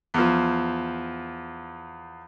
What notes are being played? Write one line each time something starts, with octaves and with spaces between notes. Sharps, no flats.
E2 F3